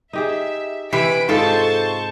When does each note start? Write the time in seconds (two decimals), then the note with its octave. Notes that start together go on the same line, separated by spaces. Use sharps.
0.13 D#4 G4 G#4 E5
0.93 C3 E3 B4 B6 D7
1.29 G#2 D#4 F4 A4 C5 A5 C#6